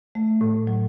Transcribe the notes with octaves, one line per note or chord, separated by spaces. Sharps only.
A3
A2
F#3